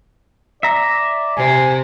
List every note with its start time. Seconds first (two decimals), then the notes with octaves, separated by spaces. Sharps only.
0.63 D5 E5 A#5
1.37 C3 G#5